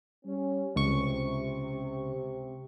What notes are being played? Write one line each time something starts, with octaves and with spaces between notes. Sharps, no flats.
G3 C#4
C#2 C3 C#6